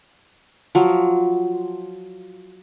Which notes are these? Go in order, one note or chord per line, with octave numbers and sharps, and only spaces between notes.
F3 F#3